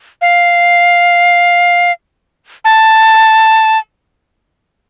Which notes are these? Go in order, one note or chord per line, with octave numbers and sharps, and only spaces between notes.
F5
A5